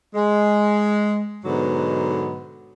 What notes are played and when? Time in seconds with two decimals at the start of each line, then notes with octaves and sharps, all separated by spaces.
0.15 G#3
1.45 G#2 B2 D3 F#3 B3